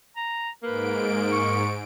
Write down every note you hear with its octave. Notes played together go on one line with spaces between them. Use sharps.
A#5
G#2 A#3 B4 D7
C#6